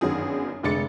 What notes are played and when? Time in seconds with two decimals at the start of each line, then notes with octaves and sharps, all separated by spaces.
0.01 G1 F#2 D#3 F#3 G#4 D#6
0.63 F1 D3 G#3 D6 A6 C#7